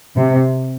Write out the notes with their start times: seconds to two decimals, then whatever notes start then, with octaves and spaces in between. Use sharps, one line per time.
0.17 C3